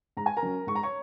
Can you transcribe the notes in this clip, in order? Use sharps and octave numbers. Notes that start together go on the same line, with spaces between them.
G#2 A#5
G#5
A#4 A#5
F#3 C#4
G#2 C#6
A#5
C#5 C#6